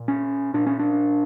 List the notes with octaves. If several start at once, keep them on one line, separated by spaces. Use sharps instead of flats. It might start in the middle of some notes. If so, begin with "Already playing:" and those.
Already playing: A#2
C#4
A#2 D4
C#4
D4